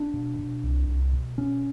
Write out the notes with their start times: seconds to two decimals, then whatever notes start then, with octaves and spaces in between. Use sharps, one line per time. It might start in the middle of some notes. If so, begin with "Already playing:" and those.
Already playing: D4
0.14 B2
0.39 B2
0.63 C2
0.88 C2
1.13 B2
1.38 B2 C#4